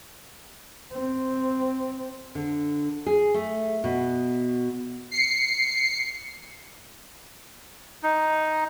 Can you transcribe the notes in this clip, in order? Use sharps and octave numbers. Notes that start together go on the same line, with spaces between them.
C4
D3
G#4
A3
B2
C7 C#7
D#4